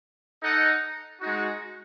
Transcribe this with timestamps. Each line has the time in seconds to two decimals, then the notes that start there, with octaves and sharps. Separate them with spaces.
0.41 D#4 A4 D#5 F#5
1.21 G#3 D#4 F#4